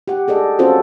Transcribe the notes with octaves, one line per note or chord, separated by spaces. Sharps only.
G4 F#5
G#4 A4 D5 D#5
C4 C#4 F4 F#4 A4 C5